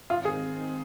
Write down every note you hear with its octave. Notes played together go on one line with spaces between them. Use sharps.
G#2 D#3 C4 D#4 F4
G#4